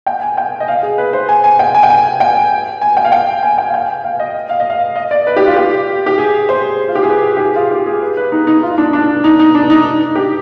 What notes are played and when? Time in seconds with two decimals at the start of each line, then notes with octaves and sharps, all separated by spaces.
0.06 G5
0.21 G#5
0.37 G5
0.60 D#5
0.68 F5
0.83 G#4
0.98 B4
1.13 C5
1.29 G#5
1.44 G#5
1.59 G5
1.75 G#5
1.83 G5
1.90 G#5
2.20 G5
2.82 G#5
2.97 G5
3.05 F5
3.12 G5
3.43 G#5
3.58 G5
3.69 F5
3.74 G5
4.04 F5
4.20 D#5
4.49 F5
4.60 D#5
4.70 F5
4.96 D#5
5.11 D5
5.27 B4
5.36 G4
5.47 F4
5.56 G4
6.06 G4
6.18 G#4
6.49 C5
6.88 F4
6.95 G4
7.03 G#4
7.09 B4
7.37 G4
7.40 G#4
7.55 F4
7.71 G4
7.86 G#4
8.02 B4
8.17 B4
8.32 D#4
8.47 D#4
8.63 F4
8.78 D4
8.93 D4
9.24 D#4
9.39 D#4
9.55 D4
9.70 D#4
10.15 G4